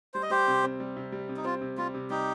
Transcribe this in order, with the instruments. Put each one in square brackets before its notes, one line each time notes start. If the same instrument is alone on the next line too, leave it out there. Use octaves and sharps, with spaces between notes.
[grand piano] G3 [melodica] C5
[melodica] D#5
[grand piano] G3 [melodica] G4 C5
[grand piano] C3
C4
G3
C3
G3
C3
[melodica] D#4
[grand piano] C4 [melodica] F4
[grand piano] C3
[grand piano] G3 [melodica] F4
[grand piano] C3
[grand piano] G3 [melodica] D#4 G4